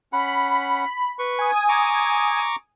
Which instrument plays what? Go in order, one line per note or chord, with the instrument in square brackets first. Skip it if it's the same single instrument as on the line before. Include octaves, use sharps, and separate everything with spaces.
[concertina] C#4 F#5 [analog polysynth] B5
[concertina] B4 C#6
[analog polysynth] G#5 D#6
[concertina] A#5 C#6 D6